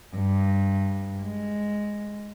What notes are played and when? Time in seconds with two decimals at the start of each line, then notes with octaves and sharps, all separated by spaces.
0.13 G2
1.21 G#3